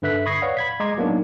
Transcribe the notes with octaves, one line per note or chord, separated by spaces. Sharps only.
G2 D3 B4 E5 F#6 B6
B5 C#6 D#6 G#6 A#6 C7
B4 C#5 D5 F5 F#5
B5 G#6 B6
G#3 D#5 A#5 C6 D6 G#6
F#3 A#3 B3 D4 D#4